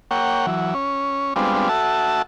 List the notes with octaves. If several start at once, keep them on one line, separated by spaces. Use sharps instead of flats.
A#3 C#5 F#5 G5
E3 F#3
C#4
G3 G#3 B3 C4 D4 F4
F#4 A4 E5 A5